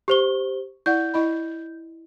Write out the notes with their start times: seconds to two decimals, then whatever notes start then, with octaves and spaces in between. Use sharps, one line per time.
0.08 G4 C5 C#6 G7
0.86 E4 D5 F#5 G6
1.14 E4 D#5 B5